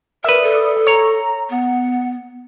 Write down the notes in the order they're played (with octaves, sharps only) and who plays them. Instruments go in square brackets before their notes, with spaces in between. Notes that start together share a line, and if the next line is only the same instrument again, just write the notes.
[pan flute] A#4 [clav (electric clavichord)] B4 E5 [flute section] D5 D#6
[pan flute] A4
[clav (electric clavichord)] C#5 [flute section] A#5
[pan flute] B3 [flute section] F#5